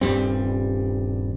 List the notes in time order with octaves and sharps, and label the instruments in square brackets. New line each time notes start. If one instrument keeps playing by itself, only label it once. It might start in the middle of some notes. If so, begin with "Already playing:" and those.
[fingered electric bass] D#1 G2 G3 C4